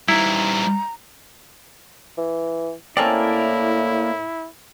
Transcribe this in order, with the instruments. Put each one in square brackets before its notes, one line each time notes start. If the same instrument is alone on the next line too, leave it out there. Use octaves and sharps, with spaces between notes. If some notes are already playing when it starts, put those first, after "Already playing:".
[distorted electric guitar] G3 D#4 [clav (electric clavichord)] E4 [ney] A#5
[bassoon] E3
[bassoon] A2 [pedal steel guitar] A#3 A#4 D5 [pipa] C4 C#4 A4 [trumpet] E4